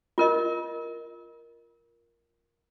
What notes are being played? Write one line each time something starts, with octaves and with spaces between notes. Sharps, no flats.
F4 A#4 D#5